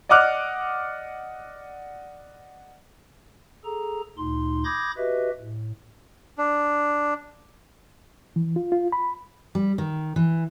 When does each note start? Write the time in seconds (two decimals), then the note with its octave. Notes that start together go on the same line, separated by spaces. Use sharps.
0.09 D5 D#5 F#5 D6 F6 F#6
3.65 G#4 A4 A#5
4.17 D2 A#2 D#4 C6
4.65 B5 D6 D#6 G6 G#6 A#6
4.97 F#4 G4 B4 D#5 E5
5.40 A2
6.38 D4
8.36 E3
8.56 F4
8.72 F4
8.92 B5
9.55 G3
9.78 D#3
10.16 E3